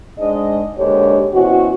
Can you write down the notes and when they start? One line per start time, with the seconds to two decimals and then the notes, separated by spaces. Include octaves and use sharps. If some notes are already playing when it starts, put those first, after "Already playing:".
0.19 G#2 G#3 D4 D#5
0.78 D#2 G#2 D3 D4 G4 C#5
1.33 B2 E3 C4 C#4 F#4